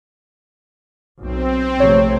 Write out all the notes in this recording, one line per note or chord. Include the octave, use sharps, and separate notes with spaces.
B1 C4
A#1 C3 A3 C#5